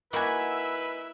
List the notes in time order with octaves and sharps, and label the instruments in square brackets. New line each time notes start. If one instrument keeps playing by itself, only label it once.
[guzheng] A#3 F#4 B5 [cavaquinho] D#4 G#5 [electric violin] E4 E5 [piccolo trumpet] B4